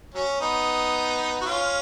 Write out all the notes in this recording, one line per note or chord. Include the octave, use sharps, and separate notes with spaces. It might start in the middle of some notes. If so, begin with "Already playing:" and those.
F#3 C#4
B3 D#4
F#4
C#4 F4